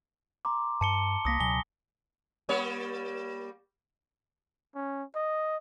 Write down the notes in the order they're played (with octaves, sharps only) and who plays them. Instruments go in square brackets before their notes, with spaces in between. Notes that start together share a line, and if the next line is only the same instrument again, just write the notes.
[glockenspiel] A#5 C6 D6
[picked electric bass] G2 [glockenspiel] A5 C#7 G7
[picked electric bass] C2 A#3 [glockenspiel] D#6 A#6 B6
[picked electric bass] C#2 B2 F#3 [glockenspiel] G#5 G7
[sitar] G3 A#3 C#5
[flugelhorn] C#4
D#5